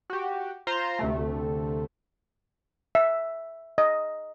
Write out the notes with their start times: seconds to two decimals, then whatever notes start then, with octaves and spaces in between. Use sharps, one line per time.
0.10 F#4 G4
0.67 F4 C5 A#5 C6
0.99 D2 C3 A3
2.95 E5
3.78 D#5